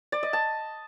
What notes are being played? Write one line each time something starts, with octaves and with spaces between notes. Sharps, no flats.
D5
D#5
A5